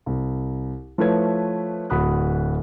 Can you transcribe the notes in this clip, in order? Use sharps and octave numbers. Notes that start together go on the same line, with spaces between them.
C2
F3 A3 E4 B4 C#5 G#6
D1 F#4 B5 D#6 F#6